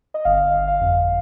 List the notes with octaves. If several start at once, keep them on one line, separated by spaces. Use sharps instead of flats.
D#5
G1 F5
G1
F5
F2